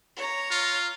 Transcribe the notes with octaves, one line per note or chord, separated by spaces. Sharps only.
C#5 A#5
F4